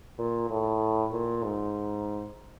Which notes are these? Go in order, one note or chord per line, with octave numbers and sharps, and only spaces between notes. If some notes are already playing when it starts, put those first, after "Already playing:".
A#2
A2
A#2
G#2